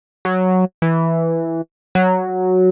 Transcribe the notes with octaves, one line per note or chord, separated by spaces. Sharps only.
F#3
E3
F#3